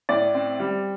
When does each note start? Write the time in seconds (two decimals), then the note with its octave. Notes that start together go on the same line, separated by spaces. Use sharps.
0.09 A2 D5
0.34 C4
0.60 G3